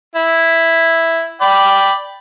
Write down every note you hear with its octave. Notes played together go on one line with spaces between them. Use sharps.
E4
D5 G5 B5